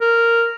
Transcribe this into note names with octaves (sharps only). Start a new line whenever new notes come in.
A#4